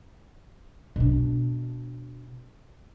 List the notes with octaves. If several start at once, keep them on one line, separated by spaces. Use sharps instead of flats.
B2 D4